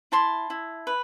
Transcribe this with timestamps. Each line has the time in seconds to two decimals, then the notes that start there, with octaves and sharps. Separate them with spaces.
0.12 E4 A5 C6
0.50 E4
0.87 B4